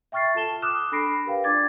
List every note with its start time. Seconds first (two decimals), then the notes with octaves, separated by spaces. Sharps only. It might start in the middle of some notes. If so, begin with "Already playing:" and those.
0.12 E5 G5 C#6 F6 A6 C7
0.35 F4 A4 A5 E7 G7
0.62 D6 D#6 F6 F#6 E7
0.92 D4 A4 B5 A#6 C7 D7
1.26 G4 A#4 B4 F5 G5
1.44 D4 F4 D5 D6 G#6 A6